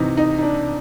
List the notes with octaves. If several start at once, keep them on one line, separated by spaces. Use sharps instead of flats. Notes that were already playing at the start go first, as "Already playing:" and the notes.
Already playing: C3 E3 D#4
D#4
D#4
D4